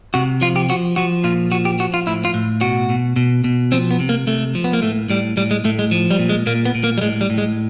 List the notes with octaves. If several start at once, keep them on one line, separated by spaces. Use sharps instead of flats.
C3 F#4
F3 F4
G4
F3 F#4
F3 F#4
A#2 F4
F3 F#4
G4
F3 F#4
F4
A2 E4
F4
A2
B2 F#4
B2
B2
B2
F3 C4
B3
C3
A#3
C3 A3
F3
B3
A#3
A2 A3
A2 G3
A2 G3
G#3
A2 A3
G#3
F3
G3
A#2
G#3
A#2 A#3
B3
A#2
A#3
G3
A2 G#3
G3
A2
G#3